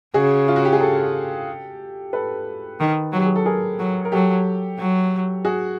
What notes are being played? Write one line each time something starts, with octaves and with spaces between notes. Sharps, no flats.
C#3 F#4 G#4
F4
F#4
G4
G#4
G4 A4
A4 B4
D#3
F#3 G4
G#4
A4
G#4 A#4
F#3
A#4
F#3 G4 A4
F#3
F#4 G#4